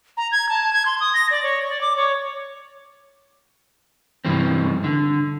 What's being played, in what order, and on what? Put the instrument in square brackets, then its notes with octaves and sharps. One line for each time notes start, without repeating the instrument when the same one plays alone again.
[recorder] A#5
G#6
A5
G#6
C6
D#6
A#6
D5
C#5
D5
D6
C#5
[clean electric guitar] G2 C3 E3 F3 A3 C4
D3